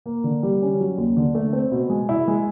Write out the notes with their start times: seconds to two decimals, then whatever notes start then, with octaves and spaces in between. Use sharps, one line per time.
0.06 A#3
0.24 D3
0.43 G3
0.62 C#4
0.80 F#3
0.98 D#2
1.17 D3
1.35 A3
1.53 C4
1.72 B2
1.90 G#3
2.09 E4
2.28 G#3